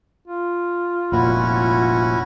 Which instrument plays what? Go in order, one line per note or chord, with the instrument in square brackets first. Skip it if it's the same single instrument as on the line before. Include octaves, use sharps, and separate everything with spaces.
[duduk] F4
[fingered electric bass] F1 A#2 [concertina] C#4 E4 F#4